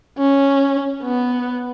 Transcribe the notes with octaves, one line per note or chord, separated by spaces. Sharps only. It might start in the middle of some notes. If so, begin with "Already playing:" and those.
C#4
B3